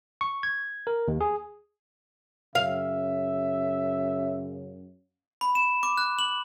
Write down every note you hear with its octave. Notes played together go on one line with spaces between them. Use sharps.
C#6
G#6
A#4
D#2
G#4
F#2 C#3 E5 F5
B5
E7
D6
F#6
F#7